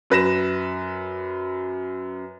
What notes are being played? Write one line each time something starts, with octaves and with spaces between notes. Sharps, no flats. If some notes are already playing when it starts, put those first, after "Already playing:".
F#2 B4 A#6 E7